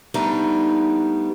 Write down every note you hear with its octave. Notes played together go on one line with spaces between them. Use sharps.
G3 A3 B3 D4 D#4